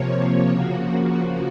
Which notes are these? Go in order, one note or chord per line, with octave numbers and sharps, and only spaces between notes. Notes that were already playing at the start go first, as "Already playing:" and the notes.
Already playing: C3 F3 A#3 C#5
C#3 F3 A#3 F#4
F#4